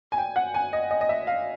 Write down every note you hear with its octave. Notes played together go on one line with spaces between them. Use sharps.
G#5
G5
F#5
G#5
D#5
D#5
D#5
E5
F5